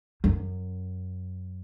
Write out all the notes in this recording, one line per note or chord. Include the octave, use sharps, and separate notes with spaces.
F#2